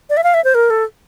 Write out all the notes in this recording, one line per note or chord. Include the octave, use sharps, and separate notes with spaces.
D5
E5
F5
E5
C5
A#4
A4